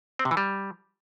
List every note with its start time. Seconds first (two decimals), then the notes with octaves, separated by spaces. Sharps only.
0.19 C4
0.25 C3
0.31 E3
0.37 G3